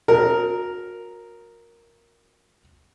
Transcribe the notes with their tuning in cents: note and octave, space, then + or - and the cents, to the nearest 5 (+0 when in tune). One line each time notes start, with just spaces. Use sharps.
F#3 -35 A#4 +0